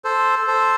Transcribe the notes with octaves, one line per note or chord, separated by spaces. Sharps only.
A4 C5
A4 C5